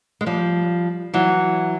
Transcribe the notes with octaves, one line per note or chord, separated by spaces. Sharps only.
G#3
F3 G3
E3 F#3